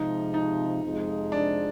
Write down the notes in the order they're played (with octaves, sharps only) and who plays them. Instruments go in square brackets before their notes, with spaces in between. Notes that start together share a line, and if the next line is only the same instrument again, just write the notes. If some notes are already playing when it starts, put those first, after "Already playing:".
Already playing: [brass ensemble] C3 F3 G#3 [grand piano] D#4
[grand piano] D#4
[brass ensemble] F2 C3 F3 G#3
[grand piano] D4